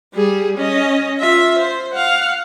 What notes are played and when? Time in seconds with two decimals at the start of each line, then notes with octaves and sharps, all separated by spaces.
0.14 G3 G#4
0.58 C#4 D#5
1.19 F4 E5
1.59 C5
1.92 F5 F#5